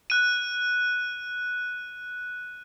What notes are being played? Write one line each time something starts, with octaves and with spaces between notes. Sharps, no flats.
F#6 D#7